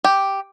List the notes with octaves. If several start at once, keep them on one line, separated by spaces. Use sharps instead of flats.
G4